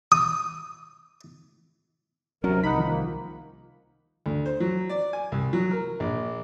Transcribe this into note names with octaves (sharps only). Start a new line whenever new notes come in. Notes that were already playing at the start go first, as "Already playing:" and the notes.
D#6
D2 C3 F#3 C#4 A#4
C2 D#4 F#5 B5
D#3 F3
A#3
D2
C5
F#3
D5
G#5
C2
F#3
A#4
A#1